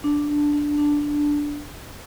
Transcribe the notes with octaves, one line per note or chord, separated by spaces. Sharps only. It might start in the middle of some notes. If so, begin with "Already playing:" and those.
D4
D4
D4
D4
D4